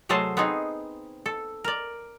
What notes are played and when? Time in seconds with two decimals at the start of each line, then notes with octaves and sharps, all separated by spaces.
0.09 C3 F#3 A3 G#4 C5 A5
0.37 B3 C4 D#4 G#4
1.26 A4
1.64 A#4 D5